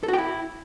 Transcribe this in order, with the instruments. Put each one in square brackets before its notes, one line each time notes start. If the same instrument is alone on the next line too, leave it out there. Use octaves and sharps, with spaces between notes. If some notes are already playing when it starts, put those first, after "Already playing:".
[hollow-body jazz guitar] A4
F#4
G5
E4